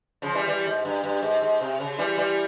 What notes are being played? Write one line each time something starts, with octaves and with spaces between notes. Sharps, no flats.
C#3 F3
E3 G3
E3 G3
G#2
G2
G2
G#2
G#2
C3
C#3
E3 G3
E3 G3